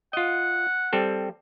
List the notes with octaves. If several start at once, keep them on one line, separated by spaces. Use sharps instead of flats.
F4 D#5 F#5
G3 C4 A4